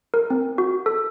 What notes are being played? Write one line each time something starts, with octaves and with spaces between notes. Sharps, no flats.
A#4
C4
F#4
A4